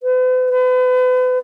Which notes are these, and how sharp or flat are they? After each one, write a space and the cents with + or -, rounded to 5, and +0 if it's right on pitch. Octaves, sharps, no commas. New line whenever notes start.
B4 +45
B4 +40